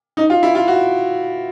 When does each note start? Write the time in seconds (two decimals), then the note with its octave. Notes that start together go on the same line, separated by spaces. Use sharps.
0.17 D#4
0.30 F4
0.43 E4
0.55 F4
0.68 F#4